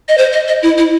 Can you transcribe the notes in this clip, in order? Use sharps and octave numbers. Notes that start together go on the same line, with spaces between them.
D#5
C5
D#5
D#5
E4
E4